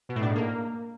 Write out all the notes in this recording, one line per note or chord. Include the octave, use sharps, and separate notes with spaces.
B2
A2
D4
G#2
A#3